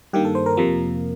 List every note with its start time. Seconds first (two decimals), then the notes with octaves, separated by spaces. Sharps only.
0.13 G2 D#3 A#3 G4
0.25 A4
0.35 C5
0.46 A#4
0.57 F2 C3 F3 A#3